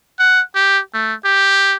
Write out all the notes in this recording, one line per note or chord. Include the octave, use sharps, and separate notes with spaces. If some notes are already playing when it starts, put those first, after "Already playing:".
F#5
G4
A3
G4